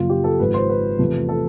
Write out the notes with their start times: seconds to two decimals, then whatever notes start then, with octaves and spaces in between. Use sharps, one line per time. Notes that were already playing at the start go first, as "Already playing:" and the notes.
Already playing: F#2 C#3 F3 A#3 F4
0.10 G4
0.24 A4
0.39 G#1 G#2 F3 B4
0.54 C5
0.69 B4
0.99 E2 C3 F3 A3
1.29 A4